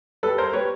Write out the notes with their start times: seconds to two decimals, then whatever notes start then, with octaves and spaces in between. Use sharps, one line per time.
0.23 G3 A4 B4
0.38 A#4 C5
0.53 G3 B4 C#5